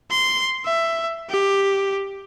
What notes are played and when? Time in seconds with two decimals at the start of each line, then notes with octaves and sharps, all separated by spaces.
0.11 C6
0.65 E5
1.30 G4